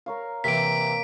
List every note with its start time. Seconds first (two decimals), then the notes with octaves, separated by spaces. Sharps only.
0.06 A#4 C#5 F5
0.44 C3 E3 A#3 B6 D7